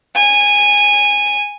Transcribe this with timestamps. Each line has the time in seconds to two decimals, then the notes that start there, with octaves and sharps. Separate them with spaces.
0.16 G#5